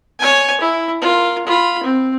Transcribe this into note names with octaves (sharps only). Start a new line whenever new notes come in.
C#5 G#5
E4
F4 A#4
F4 B5
C4